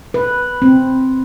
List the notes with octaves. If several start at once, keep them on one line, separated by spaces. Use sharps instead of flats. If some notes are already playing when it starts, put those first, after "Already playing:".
B4
C4